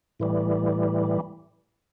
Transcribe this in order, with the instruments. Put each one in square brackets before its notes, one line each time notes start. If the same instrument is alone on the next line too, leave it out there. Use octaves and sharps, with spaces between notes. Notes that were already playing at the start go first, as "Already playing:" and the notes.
[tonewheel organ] A2 E3 G3